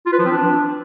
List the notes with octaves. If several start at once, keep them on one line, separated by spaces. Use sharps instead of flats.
F4
B4
F3
C4
D4